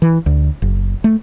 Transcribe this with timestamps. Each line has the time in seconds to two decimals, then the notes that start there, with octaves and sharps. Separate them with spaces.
0.02 E3
0.26 D2
0.62 F#1
1.04 A3